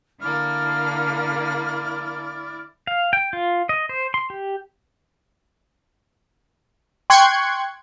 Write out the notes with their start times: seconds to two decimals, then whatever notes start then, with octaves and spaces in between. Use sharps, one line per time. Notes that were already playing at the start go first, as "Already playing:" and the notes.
0.21 D3 A#3 E4 D5 F6
2.87 F5
3.13 G5
3.33 F4
3.69 D#5
3.89 C5
4.14 C6
4.30 G4
7.10 G5 C6 C#6 F#6 G#6 C#7